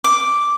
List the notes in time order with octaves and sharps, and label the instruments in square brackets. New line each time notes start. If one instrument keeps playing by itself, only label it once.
[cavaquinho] D6